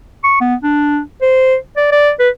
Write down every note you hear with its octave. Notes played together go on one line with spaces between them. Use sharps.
C#6
B3
D4
C5
D5
D5
B4